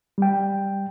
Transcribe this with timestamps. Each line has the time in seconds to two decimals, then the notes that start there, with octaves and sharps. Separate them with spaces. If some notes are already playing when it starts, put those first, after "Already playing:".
0.18 G3 G5